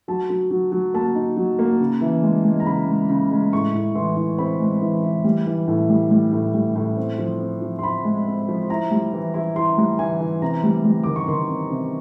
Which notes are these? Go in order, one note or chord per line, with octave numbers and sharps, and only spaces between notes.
F#3 A5
F#3
F#3
F#3
A#3 A5
D#4
F#3
A#3
C#3
E3
G#3
G#3
A#5
C#3 B5
G#3
C#3
G#3
A2 C#6
A2
E3 C6
E3
C4 B5
G#3
E3
E3
G3
E3
A2
G3
G3
A2
G3
A2
C4
F3
C4
F3
C6
F3 B5
G#3
C4
F3
E4 A#5
G3
E3
E4
E4 C6
G3
E3 G#5
E3
C3 A#5
G3
G3
D#3 D6
C#6
D#3 C6
C4
C3